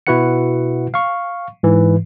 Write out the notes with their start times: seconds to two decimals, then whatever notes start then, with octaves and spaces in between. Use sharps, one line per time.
0.07 B2 E4 F#4 B4 F#5 C#7
0.94 F5 C#6
1.63 G#2 E3